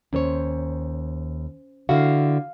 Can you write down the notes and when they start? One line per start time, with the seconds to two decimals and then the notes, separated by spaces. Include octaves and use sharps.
0.13 D#2 C#4 C5 C#5
1.89 D3 E4 F#4 F5